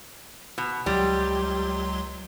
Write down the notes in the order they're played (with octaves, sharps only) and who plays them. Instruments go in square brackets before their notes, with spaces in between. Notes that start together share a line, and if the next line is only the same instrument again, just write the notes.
[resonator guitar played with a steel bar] B2
[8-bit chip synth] C#2 F#3 C6 [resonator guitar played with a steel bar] G3